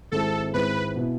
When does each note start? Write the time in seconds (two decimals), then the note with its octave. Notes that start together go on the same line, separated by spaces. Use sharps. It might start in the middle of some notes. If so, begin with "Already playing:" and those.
0.12 G#1 G#2 G#3 C4 E4 A4
0.53 G#1 G#2 G#3 C4 E4 B4
0.96 B2 B3 E4